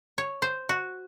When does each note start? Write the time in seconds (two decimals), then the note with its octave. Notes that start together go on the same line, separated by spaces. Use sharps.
0.18 C#5
0.42 C5
0.69 F#4